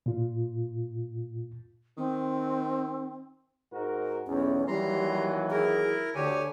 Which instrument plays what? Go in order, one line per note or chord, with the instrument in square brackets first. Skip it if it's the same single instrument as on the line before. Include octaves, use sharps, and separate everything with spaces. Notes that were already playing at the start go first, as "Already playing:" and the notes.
[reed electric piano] A#2 F4
[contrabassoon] D#3 [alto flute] C4
[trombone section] G#2 F#4 A#4
[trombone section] B1 E2 [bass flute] C#4
[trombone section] D#2 E3 F#3 [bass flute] G3 [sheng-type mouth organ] A#5 C6
[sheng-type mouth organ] E4 A#4 [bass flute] G#4
[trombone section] D2 [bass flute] D3 [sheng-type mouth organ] G4 C#5 G#5